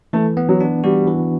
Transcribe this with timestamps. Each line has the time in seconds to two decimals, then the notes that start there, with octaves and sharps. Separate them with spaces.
0.13 E3 A3
0.37 B3
0.49 F#3
0.60 D4
0.84 G3 F#4
1.08 E3